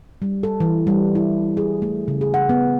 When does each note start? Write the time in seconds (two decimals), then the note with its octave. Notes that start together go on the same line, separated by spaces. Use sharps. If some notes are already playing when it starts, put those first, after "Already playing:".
0.22 G3
0.43 A4
0.60 E3
0.87 G3
1.15 E4
1.57 G#4
1.82 A3
2.08 C#3
2.21 G#4
2.34 F#5
2.49 B3